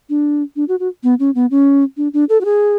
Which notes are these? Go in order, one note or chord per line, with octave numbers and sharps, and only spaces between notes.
D4
D4
F#4
F#4
B3
C#4
B3
C#4
D4
D4
A4
F#4
G#4